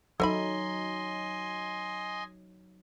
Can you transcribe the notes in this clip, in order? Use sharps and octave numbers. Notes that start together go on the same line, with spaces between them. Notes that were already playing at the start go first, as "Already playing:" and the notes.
F#3 D#4 A4 D#5 E5 G#5 B5 C6